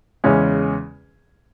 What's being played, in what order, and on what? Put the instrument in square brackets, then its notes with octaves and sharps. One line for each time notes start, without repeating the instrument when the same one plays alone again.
[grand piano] E2 C#3 E3 G#3 C#4